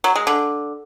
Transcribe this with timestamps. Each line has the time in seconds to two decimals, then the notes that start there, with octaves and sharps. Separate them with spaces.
0.04 F#3
0.15 G#3
0.27 D3